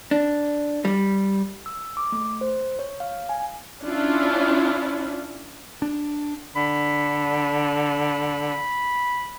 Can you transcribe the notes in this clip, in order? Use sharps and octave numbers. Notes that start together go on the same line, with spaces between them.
D4
G3
E6
D6
A3
C5
C#5
F5
G#5
C#4 D4 E4 F4
D4
D3 B5